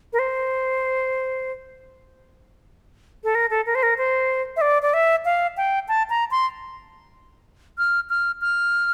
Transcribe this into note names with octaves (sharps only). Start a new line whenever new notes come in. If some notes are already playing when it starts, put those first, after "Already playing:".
A#4
C5
A4
A#4
A4
A#4
C5
A#4
C5
E5
D5
D5
E5
F5
G5
A5
A#5
C6
F6
F6
F6